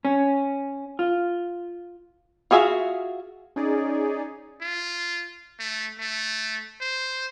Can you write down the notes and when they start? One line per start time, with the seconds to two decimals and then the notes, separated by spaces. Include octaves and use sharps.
0.05 C#4
0.99 F4
2.51 F4 F#4 G#4 E5 F5
3.56 C#4 D#4 G#4 D5
4.61 F4
5.60 A3
5.99 A3
6.81 C5